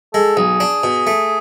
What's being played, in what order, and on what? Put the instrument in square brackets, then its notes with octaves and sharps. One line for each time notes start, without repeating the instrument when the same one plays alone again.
[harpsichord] G#3 [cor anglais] A4
[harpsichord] B1 [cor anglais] G#4
[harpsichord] D4
B2
A3